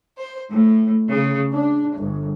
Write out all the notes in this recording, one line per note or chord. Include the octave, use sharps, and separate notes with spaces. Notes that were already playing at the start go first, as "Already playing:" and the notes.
C5
A2
C#3
D4
G1